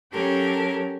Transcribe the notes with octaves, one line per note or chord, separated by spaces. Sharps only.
F#3 C#4 G4 A4 A#4